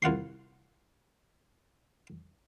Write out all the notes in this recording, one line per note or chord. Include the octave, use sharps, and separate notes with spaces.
C2 F4 F#5 C6